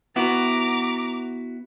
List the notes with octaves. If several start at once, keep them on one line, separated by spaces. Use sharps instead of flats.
B3 E4 F#4 A#5 D6